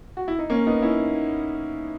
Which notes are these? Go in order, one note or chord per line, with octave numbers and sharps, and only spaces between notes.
F#4
E4
D#4
A#3 C#4
B3 D#4
C#4 E4